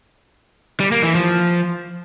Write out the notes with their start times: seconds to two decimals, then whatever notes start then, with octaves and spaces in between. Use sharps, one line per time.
0.80 G3
0.92 A#3
1.03 E3
1.15 F3